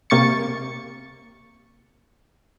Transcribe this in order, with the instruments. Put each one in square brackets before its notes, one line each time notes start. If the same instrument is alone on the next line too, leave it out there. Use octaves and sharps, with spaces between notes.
[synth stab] C3 A#3 C#6 A6 C#7